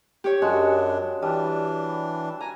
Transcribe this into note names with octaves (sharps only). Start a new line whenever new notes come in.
G4 C#5
F#2 G#3 D4 F#4
E3 G3 D4
G#5 A#5